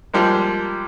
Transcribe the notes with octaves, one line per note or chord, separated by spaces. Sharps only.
F3 G3 G#3 A#3